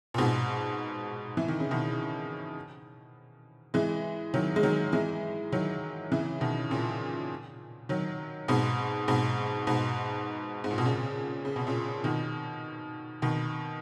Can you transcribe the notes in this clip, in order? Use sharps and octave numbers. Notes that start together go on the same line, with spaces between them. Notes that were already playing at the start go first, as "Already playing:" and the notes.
A#2
G#2 B2
E3
D#3
C#3
B2 D#3
E3 G#3
D#3 F#3
G#3
D#3 F#3
E3 G#3
D#3 F#3
C#3 E3
B2 D#3
A#2 C#3
D#3 F#3
G#2 B2
G#2 B2
G#2 B2
G#2
A#2
B2
A#2 C#3
C#3
B2
A#2 C#3
B2 D#3
B2 D#3